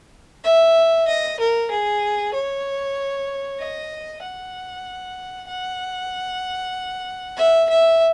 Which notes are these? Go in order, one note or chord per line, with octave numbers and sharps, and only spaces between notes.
E5
D#5
A#4
G#4
C#5
D#5
F#5
F#5
E5
E5